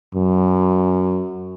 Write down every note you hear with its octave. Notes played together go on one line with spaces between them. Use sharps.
F#2